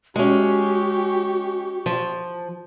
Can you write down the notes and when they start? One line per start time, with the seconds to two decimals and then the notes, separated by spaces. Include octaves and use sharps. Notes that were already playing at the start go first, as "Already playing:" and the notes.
0.16 G#3 C#4 F#4 G4 C#6
1.86 F3